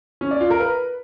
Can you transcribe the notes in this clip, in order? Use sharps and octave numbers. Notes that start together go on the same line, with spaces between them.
C#4
D5
F4
A#4
B4